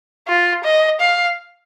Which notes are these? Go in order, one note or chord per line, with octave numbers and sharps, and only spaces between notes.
F4
D#5
F5